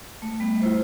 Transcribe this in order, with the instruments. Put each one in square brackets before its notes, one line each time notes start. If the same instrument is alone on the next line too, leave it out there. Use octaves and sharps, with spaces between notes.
[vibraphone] A3
G3 A3 B3
E4 F4 C5